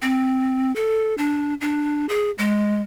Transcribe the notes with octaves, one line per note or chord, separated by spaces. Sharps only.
C4
A4
D4
D4
G#4
G#3